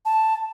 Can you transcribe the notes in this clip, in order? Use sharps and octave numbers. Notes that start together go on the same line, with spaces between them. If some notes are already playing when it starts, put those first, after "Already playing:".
A5